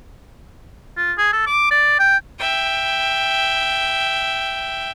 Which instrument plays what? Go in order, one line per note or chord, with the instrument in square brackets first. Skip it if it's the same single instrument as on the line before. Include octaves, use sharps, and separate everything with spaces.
[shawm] F4
G#4
A4
D6
D5
G5
[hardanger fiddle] E5 G5